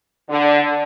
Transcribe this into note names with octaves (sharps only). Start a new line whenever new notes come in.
D3